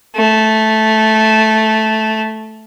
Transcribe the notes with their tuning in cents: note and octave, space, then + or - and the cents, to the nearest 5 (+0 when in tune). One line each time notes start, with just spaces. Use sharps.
A3 -10